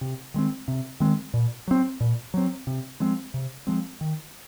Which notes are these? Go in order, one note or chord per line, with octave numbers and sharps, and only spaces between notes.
C3
D#3 G#3 C4
C3
D#3 G#3 C4
A#2
F#3 C4
A#2
F#3 C4
C3
F3 G#3 C4
C3
F3 G#3 C4
D#3